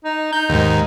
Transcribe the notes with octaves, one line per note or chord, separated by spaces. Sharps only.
D#4
D#4 G6
D#2 G#2